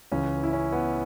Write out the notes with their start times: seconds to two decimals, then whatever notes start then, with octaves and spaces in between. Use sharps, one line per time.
0.12 C#2 C#3 E3 C#4
0.43 E4
0.53 C#4
0.72 B3